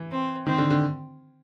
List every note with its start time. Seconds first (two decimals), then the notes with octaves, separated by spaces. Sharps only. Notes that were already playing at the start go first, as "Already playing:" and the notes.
Already playing: E3
0.11 C4
0.47 D#3 C4
0.58 D3
0.70 D3